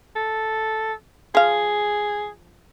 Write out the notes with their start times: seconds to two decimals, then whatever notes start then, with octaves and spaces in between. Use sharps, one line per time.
0.16 A4
1.35 F3 G#4 F5